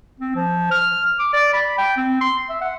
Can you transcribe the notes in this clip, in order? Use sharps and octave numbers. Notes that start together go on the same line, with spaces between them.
C4
F3
F6
D6
D5
B5
G5
C4
C6
E5
F#5